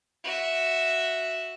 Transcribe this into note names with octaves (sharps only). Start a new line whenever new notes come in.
F#4 E5